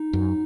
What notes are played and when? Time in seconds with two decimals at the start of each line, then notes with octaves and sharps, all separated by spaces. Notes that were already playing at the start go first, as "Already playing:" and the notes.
Already playing: D#4
0.13 F#2